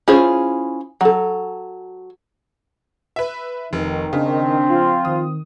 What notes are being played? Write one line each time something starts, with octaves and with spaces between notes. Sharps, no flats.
C#4 E4 F4 G#4 C5
F#3 A4
B4 E5
F1 D#3
C#3 C4 D4
F3 F4
D#3 D#6